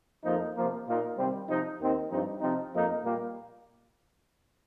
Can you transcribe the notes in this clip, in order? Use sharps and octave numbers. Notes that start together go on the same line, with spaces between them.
F2 F3 A#3 D#4
C3 F3 A#3
A#2 A#3 D#4
C3 D#3 G3 C4
C3 F3 D#4
D#2 D#3 C4 D#4
G2 F3 C4 D#4
C3 F3 C4 D#4
F2 F3 A#3 D#4
A#2 G3 A#3